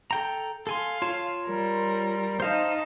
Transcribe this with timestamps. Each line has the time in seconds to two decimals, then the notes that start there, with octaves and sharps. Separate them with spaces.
0.11 A4 G5 A#5
0.67 A4 F5 G#5 C6
1.02 F4 C#5 A5
1.45 G3 A#4
2.40 D#4 C5 F5 A5